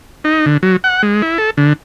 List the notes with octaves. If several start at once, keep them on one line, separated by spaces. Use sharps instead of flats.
D#4
D3
F#3
F#5
G#3
E4
A4
D3